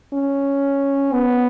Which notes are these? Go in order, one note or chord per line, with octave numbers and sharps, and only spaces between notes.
C#4
B3